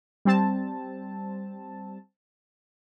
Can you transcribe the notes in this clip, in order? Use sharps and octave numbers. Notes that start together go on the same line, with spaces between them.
G3 C4 A5